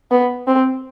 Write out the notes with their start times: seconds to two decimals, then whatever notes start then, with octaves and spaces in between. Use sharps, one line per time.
0.11 B3
0.47 C4